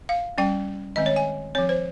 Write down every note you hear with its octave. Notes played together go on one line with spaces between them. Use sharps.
F5
G3 C#4 G5
D#3 G#3 C4 D#5
C#5
G#5
F3 C4 C#5
C5